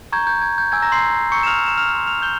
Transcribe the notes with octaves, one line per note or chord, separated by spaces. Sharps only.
A#5 C#6 G6 G#6
G6
G#6
G6
G#5 E6 G6 G#6
A#5 A#6
C6 C7
A#5 C#6 E6 G6 C#7
E7
F6 F7
E7
F6 F7
C6 F6
F6 F7
G6 G7